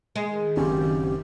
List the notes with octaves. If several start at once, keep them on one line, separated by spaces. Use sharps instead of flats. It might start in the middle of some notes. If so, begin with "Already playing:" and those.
D#3 G#3
F#1 C4 C#4 G4